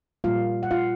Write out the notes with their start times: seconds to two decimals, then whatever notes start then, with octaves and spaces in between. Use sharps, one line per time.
0.24 A#2 G3 A#3 F4 F5
0.63 F#5
0.71 F4 F5